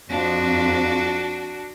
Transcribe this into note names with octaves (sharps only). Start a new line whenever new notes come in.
F2 D4 F#4